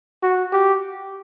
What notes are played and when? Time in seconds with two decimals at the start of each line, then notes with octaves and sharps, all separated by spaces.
0.22 F#4
0.52 G4